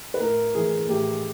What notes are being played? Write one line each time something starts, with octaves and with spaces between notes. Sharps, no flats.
B4
A2 A#4
E3 A3 G#4
A2 G4